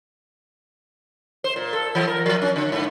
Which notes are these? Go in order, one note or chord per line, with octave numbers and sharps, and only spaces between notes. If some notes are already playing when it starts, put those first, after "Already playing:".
C5
A#2
A4
E3
A#4
F3
C#4
D3
G#2